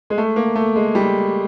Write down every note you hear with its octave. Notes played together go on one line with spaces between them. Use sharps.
G#3
A3
A#3
A3
G#3
G3